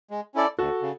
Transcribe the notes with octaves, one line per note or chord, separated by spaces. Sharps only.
G#3
C#4 E4 A4 D5
D2 F#4 A4
C#3